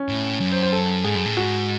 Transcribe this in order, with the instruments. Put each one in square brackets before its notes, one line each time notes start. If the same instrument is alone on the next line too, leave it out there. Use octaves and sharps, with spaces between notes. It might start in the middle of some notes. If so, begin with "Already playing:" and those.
Already playing: [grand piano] C#4
[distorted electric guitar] A2
F#2
[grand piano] C5
C5
A4
[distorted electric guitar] G#2 [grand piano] G#4
[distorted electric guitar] F#2
A2
[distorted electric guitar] G#2 [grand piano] F#4